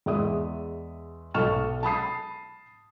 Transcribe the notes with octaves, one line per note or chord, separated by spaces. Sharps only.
E2 G#3 D5 E5 D#6
B1 A4 D#5 C#6 F6 E7
A5 B5 D#6 C7